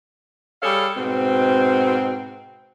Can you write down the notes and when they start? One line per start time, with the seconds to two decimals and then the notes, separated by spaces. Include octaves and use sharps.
0.62 G3 G#4 A4 C#5 F5
0.96 G#2 B2 C4